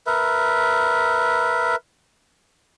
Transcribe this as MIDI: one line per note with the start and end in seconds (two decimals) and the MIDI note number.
0.07 1.76 70
0.07 1.76 71
0.07 1.76 76